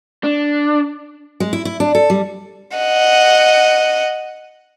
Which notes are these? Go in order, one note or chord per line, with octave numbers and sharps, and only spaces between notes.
D4
G#3
E4
E4
D4
A4
G3
D#5 F#5